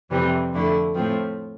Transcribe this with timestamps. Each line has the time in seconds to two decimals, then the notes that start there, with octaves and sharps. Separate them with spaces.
0.10 F2 C3 E3 G3 C4
0.53 F2 D3 A3 E4
0.95 A2 F3 C4